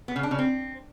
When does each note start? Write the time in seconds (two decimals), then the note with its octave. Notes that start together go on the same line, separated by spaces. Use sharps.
0.08 B3
0.16 C#3
0.23 D4
0.31 C#3
0.39 C4